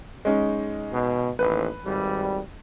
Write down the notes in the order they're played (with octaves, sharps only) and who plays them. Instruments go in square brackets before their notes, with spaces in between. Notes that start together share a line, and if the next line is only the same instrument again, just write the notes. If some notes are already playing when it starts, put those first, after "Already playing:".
[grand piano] G#3 C#4 D#4
[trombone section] B2
[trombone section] A1 D#2 [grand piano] B4
[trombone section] G#1 G3